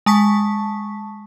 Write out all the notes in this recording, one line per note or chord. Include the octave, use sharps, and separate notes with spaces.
G#3 A5 C#6 B6